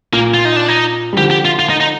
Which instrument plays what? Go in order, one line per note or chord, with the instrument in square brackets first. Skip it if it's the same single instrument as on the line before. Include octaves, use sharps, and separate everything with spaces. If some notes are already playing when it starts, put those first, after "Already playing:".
[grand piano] A#2 [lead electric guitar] A#3
[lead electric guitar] F4
D#4
D4
D#4
[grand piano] G3
[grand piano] D3 F3 [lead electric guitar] G4
[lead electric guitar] G4
F4
F4
D#4
D#4